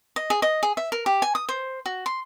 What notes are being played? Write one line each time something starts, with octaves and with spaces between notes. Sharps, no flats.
D#5
G#4
D#5
G#4
E5
A#4
G4
G#5
D#6
C5
F#4
C6